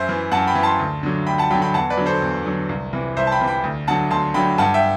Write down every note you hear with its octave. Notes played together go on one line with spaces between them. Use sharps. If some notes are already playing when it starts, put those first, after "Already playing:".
Already playing: F#2 C5 E5
E3
F#2 F#5 A5
G5 B5
E3
A5 C6
D2
D3 F#3
D2 G5 B5
F#5 A5
D3 F#3 G5 B5
G5 B5
E2 F#5 A5
B4 D5
D3 F#3
A4 C5
E2
D3 F#3
C2
C3 E3
C2 C5 E5
A5
G5 B5
C3 E3
G5 B5
D2
D3 F#3 F#5 A5
D2 A5 C6
D3 F#3 G5 B5
G2 F#5 A5
E5 G5